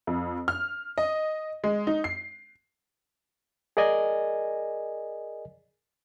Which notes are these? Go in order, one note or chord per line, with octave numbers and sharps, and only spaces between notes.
F2
F6
D#5
G#3
D#4
C7
G#4 A#4 D5 D#5 G#5